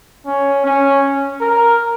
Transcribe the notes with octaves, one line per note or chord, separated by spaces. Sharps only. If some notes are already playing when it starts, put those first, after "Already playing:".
C#4
C#4
A#4